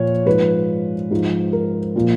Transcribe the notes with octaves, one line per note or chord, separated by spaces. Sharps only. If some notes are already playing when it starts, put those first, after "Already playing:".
Already playing: A#2 F3 C#5
G#2 F3 B4
G#2 F3
A#4
A#2 F3